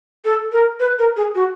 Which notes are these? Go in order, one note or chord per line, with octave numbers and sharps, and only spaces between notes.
A4
A#4
B4
A#4
G#4
F#4